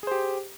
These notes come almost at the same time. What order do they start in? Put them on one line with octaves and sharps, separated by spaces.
G#4 C5 G4